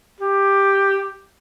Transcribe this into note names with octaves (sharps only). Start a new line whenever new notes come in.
G4